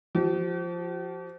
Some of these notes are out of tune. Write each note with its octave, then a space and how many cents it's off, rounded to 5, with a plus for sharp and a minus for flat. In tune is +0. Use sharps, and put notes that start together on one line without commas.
F3 +0 G4 -45